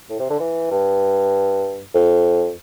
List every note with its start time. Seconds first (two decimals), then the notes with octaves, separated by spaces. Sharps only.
0.09 A2
0.20 C3
0.30 D3
0.40 E3
0.71 G2
1.94 F2